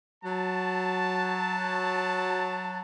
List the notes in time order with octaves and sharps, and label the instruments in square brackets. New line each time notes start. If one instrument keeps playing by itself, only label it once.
[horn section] F#3 A5